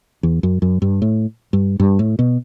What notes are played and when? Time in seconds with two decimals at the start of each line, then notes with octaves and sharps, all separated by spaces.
0.23 E2
0.43 F#2
0.62 F#2
0.82 G2
1.02 A2
1.53 G2
1.80 G2
1.99 A2
2.19 B2